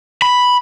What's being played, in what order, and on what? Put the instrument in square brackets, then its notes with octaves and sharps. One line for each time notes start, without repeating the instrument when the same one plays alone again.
[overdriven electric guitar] B5